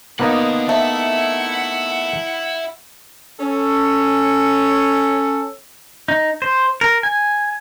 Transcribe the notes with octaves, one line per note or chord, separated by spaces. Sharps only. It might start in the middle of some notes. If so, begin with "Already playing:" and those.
A#3 B3 D#4 D5 F#5
A3 E4 E5 F#5
C#4 A4
D#4
C5
A#4
G#5